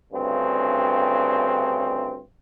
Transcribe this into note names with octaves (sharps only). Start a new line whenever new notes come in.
D2 G2 C#3 C4